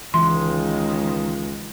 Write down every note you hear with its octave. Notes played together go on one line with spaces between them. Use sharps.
C#2 D#3 E3 G#3 C6